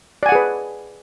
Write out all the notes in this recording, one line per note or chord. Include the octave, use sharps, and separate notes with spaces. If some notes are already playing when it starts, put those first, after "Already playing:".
G#4 B4 D5 F#5 G#5